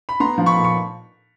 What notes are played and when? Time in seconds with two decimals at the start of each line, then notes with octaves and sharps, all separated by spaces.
0.09 B5
0.20 B3 A#5 C6
0.38 F3
0.46 B5 C#6
0.56 A#2
0.64 C#6